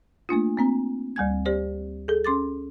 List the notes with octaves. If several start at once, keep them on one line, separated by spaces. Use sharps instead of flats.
A3 A#3 D4 F4
A#3 C4 A#5
D2 G3 G#5 G#6
G4 C5 D5
G#4 A4
C#4 C6 D6 A6